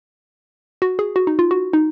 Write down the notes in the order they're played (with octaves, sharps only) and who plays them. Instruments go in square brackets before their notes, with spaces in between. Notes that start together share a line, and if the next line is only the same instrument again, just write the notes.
[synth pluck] F#4
G#4
F#4
D#4
F4
F#4
D#4